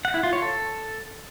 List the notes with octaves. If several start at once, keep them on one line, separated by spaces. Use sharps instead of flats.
F#5
E4
F4
C#5
A4